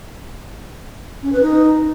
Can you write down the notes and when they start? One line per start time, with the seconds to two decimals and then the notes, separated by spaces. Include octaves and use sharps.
1.23 C#4
1.32 B4
1.42 D#4